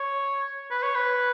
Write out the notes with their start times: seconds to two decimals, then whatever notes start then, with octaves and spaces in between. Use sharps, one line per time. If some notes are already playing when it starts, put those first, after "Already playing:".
Already playing: C#5
0.71 B4
0.83 C#5
0.95 B4